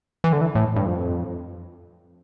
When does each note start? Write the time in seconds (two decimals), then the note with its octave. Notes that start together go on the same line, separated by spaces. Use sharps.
0.24 E3
0.33 D3
0.41 E3
0.55 A2
0.76 G2
0.86 F2